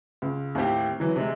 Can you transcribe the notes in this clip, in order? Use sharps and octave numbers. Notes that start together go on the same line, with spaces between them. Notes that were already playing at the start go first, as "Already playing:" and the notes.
C#2
D#2 A2 C4 G4
E3 F#3
C3 G#3